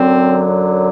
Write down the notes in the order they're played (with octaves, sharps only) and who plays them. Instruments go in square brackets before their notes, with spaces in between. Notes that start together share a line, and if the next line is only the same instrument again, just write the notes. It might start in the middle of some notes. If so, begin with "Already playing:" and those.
Already playing: [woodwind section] F#2 D3 F#3 C4